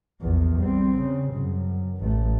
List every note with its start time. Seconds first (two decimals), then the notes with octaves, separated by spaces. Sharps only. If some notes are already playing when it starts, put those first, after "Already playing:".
0.21 A#1 E2
0.59 G3 C4
0.98 C#3
1.35 F#2
1.99 A1 A3